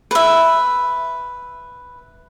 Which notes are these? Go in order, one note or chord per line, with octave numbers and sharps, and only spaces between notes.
B4 E5